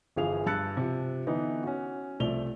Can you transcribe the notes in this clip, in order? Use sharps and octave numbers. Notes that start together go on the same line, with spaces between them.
G1 E3 F3 G#4 F5 F7
G2 A5 E6 F#6 A6 C#7
C3 F3
D3 E3 B3 D#4
C#4 F#4
C2 F3 A3 D5 F7 G7